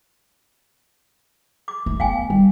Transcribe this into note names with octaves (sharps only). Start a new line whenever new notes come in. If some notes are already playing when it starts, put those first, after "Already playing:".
D6
A3
B3 F5 G5 G#5
G3